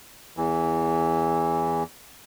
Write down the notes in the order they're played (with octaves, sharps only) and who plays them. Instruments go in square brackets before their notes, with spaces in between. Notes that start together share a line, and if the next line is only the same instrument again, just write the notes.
[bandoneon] E2 E3